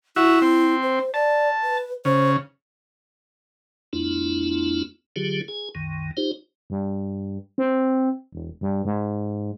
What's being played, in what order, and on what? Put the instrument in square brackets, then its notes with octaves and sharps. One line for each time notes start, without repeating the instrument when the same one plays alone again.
[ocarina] E4 [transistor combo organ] F#4 E5
[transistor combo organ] C4
[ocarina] C5
[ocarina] D5 [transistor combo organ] A5
[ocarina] B4
[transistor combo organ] C#3 [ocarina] C5
[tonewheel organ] F2 A3 B3 D4 E4 F4
D3 F#3 F4 G4 G#4
G#4 G#5
C2 F#2 D#3
D#4 F4 G4 C5
[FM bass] G2
C4
E1
G2
G#2